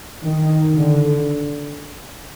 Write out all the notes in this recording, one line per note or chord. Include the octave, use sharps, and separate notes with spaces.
D#3
D3